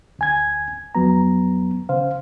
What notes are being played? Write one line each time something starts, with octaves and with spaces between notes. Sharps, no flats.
D2 G#5 G#6
F2 F#3 B3 A#5
C#3 C5 F5